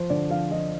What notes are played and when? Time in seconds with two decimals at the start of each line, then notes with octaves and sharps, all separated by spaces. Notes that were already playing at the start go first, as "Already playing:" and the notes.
Already playing: F3 C5
0.10 D3 D5
0.30 F3 F5
0.51 F3 D#5